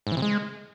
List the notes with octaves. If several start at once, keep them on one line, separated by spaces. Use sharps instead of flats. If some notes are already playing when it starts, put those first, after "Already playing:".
G#2
E3
C3
G#3